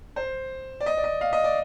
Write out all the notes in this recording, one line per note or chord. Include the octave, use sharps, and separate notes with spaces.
C5
D5
D#5
D5
D#5
F5
D#5
D5